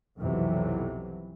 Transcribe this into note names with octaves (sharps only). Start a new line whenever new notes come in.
B1 F2 C3 E3 F#3